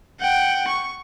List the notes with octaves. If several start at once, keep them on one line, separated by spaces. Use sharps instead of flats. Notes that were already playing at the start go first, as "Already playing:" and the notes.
F#5 G5
C#6